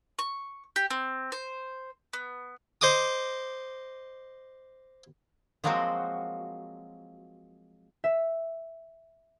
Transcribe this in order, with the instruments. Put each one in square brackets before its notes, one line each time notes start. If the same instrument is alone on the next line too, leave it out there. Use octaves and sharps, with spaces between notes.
[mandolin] C#6
G4
C4
C5
B3
[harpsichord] C5 D#5 D6 D#6
[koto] F3 F#3 G#3 A#3 C4 F#4
[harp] E5